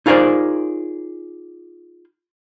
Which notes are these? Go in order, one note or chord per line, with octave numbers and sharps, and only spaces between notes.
D#4 F4 G#4 A#4 C5 D5